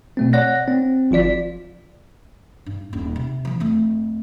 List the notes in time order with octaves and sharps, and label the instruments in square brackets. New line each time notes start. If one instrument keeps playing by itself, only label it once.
[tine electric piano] B2 A3 C4
C#5 D5 F#5 F#6 A#6
C4
G1 F3 F4 D5 B6
[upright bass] G2
D#1
C3
E3 F3
F2 A3